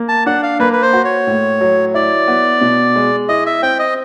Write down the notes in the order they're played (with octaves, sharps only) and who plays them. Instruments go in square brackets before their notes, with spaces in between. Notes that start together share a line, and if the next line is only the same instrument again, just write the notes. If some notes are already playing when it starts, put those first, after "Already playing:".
Already playing: [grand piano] A#3
[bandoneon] A5
[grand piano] D4 [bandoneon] F#5
[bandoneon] F5
[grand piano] A#3 [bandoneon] B4
[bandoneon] B4
C5
[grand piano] F#4
[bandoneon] C#5
[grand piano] A2
F#3
[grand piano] E4 [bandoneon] D5
[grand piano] B3
B2
G#3
[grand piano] E4 [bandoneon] D#5
[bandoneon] E5
[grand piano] C4 [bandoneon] G5
[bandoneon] D#5